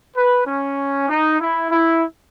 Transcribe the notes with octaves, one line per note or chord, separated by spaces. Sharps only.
B4
C#4
D#4
E4
E4